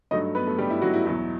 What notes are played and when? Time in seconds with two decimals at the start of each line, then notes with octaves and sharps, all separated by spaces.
0.11 G2 F#3 A3 D#4 D#5
0.35 B3 B4
0.47 A3 A4
0.58 G3 G4
0.70 E4
0.82 F#3 F#4
0.93 E4
1.06 E2 B2 F#3 E4